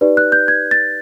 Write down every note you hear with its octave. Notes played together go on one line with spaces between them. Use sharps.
D#4 G4 B4 D5
F#6
G6
G#6
A6